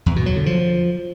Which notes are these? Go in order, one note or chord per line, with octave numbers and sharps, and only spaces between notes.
E2
B2
F#3
D3
F3